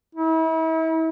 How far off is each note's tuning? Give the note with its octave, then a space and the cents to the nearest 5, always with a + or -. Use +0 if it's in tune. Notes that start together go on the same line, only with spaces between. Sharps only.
E4 -40